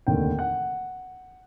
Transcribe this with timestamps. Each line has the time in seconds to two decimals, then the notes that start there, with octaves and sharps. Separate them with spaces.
0.07 F1 D#2 D3 G5
0.39 F#5